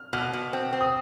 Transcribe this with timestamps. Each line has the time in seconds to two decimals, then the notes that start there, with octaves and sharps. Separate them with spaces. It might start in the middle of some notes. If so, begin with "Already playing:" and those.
Already playing: F6
0.13 B2 F6
0.33 B2
0.53 C4
0.73 C4
0.81 D#6